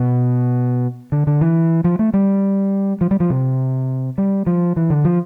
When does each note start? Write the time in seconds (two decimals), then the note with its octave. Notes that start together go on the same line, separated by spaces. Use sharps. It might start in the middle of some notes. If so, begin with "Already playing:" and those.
Already playing: B2
1.12 D3
1.27 D3
1.41 E3
1.84 F3
1.99 A3
2.14 G3
3.01 F3
3.11 G3
3.20 F3
3.30 C3
4.18 G3
4.46 F3
4.76 E3
4.90 D3
5.05 F3